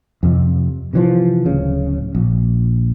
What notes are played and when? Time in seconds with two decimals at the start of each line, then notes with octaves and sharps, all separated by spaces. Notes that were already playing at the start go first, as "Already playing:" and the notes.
0.23 F2 C3
0.93 C3 E3 F3
1.46 D1 C#3
2.15 A#1